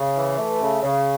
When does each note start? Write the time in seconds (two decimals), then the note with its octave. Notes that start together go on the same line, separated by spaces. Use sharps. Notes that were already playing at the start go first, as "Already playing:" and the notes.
Already playing: C#3
0.15 E3
0.38 A3
0.61 C#3
0.83 C#3